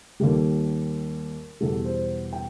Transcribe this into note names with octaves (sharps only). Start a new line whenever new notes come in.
D#2 D#3 G3 A4
E2 B2 G3 A4
C5
G5